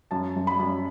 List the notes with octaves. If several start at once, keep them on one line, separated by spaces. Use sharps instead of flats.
F#2 A5
F#2
B5
F#2